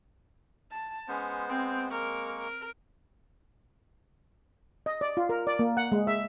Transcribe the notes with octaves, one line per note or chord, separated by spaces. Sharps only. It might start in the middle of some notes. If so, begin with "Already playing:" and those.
A5
G#3 B3 C#4 C5
C4
G#3 A#3 A#4 C#6
A#4
D#5
D5
F4
A#4
D5
A#3
F#5
G#3
E5